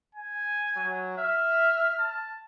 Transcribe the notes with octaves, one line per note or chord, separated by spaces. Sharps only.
G#5
F#3
E5 F6
A5